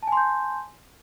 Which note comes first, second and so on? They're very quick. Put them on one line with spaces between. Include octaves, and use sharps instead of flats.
A5 G#5 C6 G6